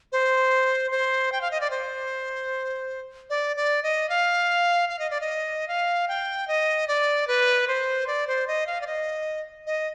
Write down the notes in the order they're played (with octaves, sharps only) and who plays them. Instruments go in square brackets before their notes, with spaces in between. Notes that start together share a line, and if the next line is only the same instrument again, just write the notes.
[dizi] C5
C5
G5
F5
D#5
D5
C5
D5
D5
D#5
F5
F5
D#5
D5
D#5
F5
G5
D#5
D5
B4
C5
D5
C5
D#5
F5
D5
D#5
D#5